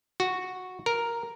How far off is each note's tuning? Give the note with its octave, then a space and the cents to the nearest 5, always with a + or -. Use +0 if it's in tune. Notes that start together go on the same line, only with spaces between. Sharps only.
F#4 -5
A#4 +0